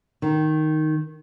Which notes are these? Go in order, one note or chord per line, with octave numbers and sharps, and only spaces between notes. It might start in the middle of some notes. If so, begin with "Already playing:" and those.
D#3